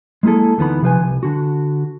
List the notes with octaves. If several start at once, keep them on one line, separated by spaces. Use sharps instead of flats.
G#3 A#3 E4 G#4 A4
D2 E3 B3 D#4 B5
C3 F3 B4 G#5
C2
D3 F#4